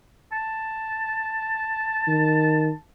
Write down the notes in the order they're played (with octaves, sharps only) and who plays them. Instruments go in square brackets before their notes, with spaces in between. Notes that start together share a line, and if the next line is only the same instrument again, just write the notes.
[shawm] A5
[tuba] D#3